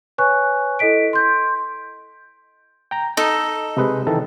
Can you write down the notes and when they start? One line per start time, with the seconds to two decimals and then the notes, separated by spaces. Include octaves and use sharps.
0.18 B4 C#5 G#5 C#6 F#6
0.79 E4 A4 D#5 B6 D7
1.13 C6 G6
2.91 G5 A#5
3.17 D#4 A4 D#5
3.77 C3 G#3 B4 D#5
4.07 D#3 E3 A4